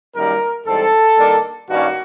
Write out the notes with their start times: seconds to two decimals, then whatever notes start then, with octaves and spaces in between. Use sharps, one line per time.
0.15 F#2 D#3 G3 A#3 A#4
0.67 G#2 E3 G3 C4 A4
1.18 D#3 G3 A#3 D4
1.70 G2 D#3 G3 A#3 C#4 F#4